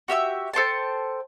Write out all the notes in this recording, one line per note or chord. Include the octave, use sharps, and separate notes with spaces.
F#4 G4 E5 E6
A4 C5 G5 A5